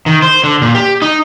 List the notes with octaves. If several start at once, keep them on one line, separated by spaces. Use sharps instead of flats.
D#3
C5
D3
A#2
G4
D#4